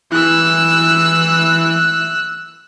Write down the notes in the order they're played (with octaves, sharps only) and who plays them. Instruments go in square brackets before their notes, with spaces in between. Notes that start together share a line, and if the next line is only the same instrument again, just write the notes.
[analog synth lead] E3 [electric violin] E6 F#6